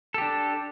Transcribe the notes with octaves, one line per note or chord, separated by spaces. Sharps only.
D4 G4 A4